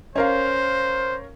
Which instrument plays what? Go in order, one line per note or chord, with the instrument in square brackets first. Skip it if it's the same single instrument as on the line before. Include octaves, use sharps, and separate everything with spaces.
[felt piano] C#4 A#4 F5 [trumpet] C5